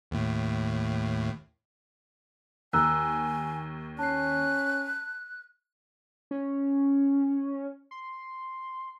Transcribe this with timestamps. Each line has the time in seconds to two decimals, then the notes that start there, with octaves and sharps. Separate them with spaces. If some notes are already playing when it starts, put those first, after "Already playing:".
0.11 D#2 A2
2.73 D#2 G#5 A#5 E6 F#6
3.99 C#4 A5 F#6 C7
6.31 C#4
7.91 C6